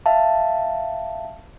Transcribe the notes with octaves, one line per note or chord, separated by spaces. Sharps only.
E5 F5 A5